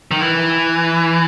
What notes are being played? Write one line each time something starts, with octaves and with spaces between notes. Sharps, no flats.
D#3
E3